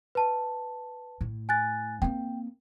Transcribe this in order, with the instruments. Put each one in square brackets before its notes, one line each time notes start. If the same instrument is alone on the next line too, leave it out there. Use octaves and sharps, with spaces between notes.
[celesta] B4 A5
[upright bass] A2
[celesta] G#5 F#6 A6
[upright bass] A#3 C4 [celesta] G5